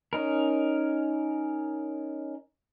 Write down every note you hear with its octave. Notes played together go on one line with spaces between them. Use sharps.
C#4 D#4 A#4